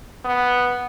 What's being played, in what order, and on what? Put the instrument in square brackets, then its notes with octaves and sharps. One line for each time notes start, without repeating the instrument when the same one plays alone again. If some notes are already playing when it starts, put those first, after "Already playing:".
[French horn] B3